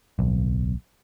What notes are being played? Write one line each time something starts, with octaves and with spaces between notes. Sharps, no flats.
D1 B1